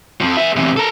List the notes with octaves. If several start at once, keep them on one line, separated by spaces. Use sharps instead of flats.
F2 F3
G#4 E5
E2 C3
A4 A#4